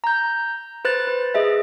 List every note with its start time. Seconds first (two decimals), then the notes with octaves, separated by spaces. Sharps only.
0.04 A#5 G6
0.85 B4 C5 F#6 A6
1.07 B4
1.35 G#4 D#5 E5